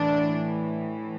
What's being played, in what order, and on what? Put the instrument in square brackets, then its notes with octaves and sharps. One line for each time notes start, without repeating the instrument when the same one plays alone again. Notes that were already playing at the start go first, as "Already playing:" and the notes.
Already playing: [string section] A2 E3 D4